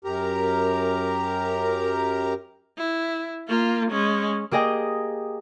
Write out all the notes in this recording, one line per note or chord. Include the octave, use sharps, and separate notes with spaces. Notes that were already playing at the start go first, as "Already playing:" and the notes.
F#2 G4 A#4 A#5
E4
A#3 F4
G#3 C#4
A#3 G4 G#4 D#5 G5